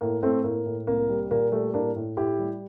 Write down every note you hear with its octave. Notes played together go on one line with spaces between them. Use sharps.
A2 A#3
A2 A3 C4
A2 A#3
A2
C2 A#3
G3
A#2 A#3
G3 A3
A2 A#3 D4
A2
A2 E4 G4
G3